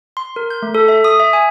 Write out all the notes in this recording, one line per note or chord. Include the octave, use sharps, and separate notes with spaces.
C6
A#4
G6
A3
A4
E5
D#6
E5
G#5